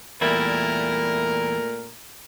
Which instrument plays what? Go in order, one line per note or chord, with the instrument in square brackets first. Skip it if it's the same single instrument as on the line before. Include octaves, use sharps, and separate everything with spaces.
[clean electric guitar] E2 G3 E4 [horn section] A#2 A3 A#4